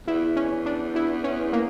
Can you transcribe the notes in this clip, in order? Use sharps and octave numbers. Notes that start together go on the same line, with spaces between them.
E2 E4
C#4
D4
E4
C#4
A#3